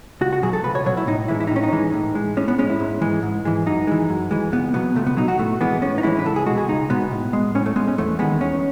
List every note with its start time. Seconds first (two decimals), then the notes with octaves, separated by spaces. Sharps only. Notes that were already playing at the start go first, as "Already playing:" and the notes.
0.21 C#2 F#4
0.33 F#4
0.43 B2 F#3 G#4
0.53 A4
0.64 C#2 B4
0.75 C#5
0.86 B2 F#3 C#5
0.97 E4
1.07 A2 D#4
1.28 E3 G#3 E4
1.40 E4
1.47 D#4
1.51 A2 C#4
1.63 D#4
1.72 E3 G#3
1.94 A2
2.15 G#3
2.37 A2 C#4
2.48 B3
2.59 G#3 C#4
2.69 E4
2.80 G#2
3.01 E3 G#3
3.23 G#2
3.45 E3 G#3
3.66 F#2 D#4
3.87 E3 G#3
4.10 F#2
4.31 E3 G#3
4.52 C#2 B3
4.74 B2 F#3 B3
4.95 C#2 A3
5.07 B3
5.17 B2 F#3 D#4
5.28 F#4
5.39 A2 A3
5.61 E3 G#3 B3
5.82 A2 C#4
5.98 D#4
6.03 E3 G#3 E4
6.19 B4
6.25 C#2 A4
6.36 G#4
6.46 G#3 F#4
6.50 B2
6.58 G#4
6.68 C#2 D#4
6.90 B2 G#3 B3
7.11 A2
7.33 G#3
7.55 A2 C#4
7.66 A3
7.76 G#3 B3
7.88 C#4
7.98 E2 A3
8.19 D#3 G#3 B3
8.41 E2 C#4